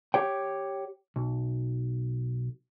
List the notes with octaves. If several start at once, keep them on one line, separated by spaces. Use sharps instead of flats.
G4 C#5 G5
B1